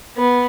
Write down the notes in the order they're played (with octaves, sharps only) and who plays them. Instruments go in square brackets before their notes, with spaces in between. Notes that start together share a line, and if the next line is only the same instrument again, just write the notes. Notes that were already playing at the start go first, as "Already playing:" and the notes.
[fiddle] B3